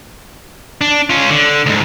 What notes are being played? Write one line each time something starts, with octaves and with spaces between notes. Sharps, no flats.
D4
C#4 F4
D3
D2 G#2